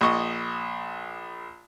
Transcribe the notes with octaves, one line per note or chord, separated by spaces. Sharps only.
A#1 D#5 C#6 D#6